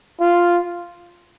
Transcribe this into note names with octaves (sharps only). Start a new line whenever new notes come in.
F4